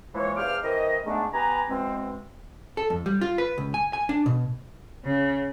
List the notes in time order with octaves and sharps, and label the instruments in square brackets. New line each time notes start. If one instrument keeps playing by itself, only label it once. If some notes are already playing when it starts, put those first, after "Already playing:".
[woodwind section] E3 F3 G#3 A#3 C#5
E2 G2 C5 F5 D6 F6
E3 C4 A#4 D#5
G#2 G#3 A3 B3 D4
B3 G4 B4 G#5 A#5
B2 E3 G#3 C4
[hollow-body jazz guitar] A4
F2
G3
F4
B4
C#2
G#5
G#5
D4
B2
[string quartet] C#3